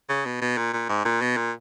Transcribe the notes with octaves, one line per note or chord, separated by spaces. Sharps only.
C#3
B2
B2
A#2
A#2
G#2
A#2
B2
A#2